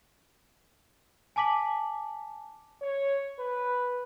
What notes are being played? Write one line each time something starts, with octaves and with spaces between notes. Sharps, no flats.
G#5 A5 D6 B6 F#7
C#5
B4